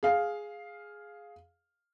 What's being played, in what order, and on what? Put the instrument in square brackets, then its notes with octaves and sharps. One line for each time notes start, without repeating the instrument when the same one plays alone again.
[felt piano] G#4 F5